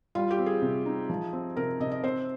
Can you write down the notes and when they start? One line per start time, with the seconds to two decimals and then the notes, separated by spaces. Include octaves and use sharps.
0.15 G3 F4
0.31 G4
0.38 C4
0.46 G#4
0.62 C3
0.86 D#4
1.10 F3
1.33 C4
1.56 C3 A#4
1.80 C3 D#5
1.91 D#5
2.04 C4 C5